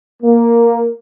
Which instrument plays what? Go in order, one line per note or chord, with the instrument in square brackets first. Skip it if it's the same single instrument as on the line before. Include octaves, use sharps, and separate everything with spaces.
[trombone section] A#3